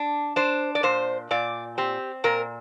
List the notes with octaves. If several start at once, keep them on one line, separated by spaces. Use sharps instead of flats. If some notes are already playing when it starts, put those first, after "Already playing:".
Already playing: D4
D4 C5
D5
A#2 C5
A#2 D5
C4 G4
A#2 A#4